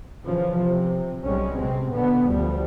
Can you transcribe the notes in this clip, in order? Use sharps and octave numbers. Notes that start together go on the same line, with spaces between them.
C#3 E3 F3
C3
B1 G3 G#3 C#4
C3 C4
B2 D3 B3
D2 F3 G3